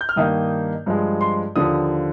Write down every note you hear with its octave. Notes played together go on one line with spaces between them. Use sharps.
G6
F6
G2 D#3 A#3 D#4 D#6
G2 F3 G#3
C6
D#2 D3 F3 D#6